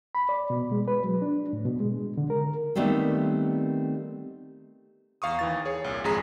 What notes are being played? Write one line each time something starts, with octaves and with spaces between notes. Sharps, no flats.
B5
D5
B2
G#3
B4
F#3
D4
A2
B2
G#3
D3
A#4
D#3 G3 A3 B3 C4
E2 F5 C#6 D#6
D#2 E3 A6
G#4 C#5
C2 A#2
G#1 F2 G#3 G#4 A#5 B6